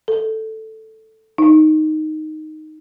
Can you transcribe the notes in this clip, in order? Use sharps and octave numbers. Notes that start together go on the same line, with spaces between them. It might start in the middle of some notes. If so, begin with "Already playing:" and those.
A4
D#4